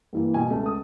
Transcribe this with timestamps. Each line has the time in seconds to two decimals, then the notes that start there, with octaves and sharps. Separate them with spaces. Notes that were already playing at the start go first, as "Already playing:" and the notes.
0.13 G2 E3 A#3
0.34 B2 G#5
0.50 C#2 A3 A5
0.66 D#6